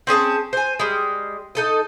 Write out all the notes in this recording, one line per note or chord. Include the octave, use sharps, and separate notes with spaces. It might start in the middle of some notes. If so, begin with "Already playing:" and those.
C4 C#4 G#4 A5
C5 G#5
G3 G#3
D#4 A4 D#5